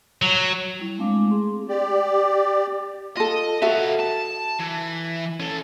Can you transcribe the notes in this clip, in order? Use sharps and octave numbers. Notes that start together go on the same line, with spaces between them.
F#3
G3 E4
G#3 A3 C4 D4 F5 D6
G#4 C6
G4 D5
F4 A4 D#5
B3 F#4 A4 E5 F5
A5
E3
C#4 A4